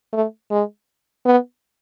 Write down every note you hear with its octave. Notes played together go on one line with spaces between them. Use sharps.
A3
G#3
B3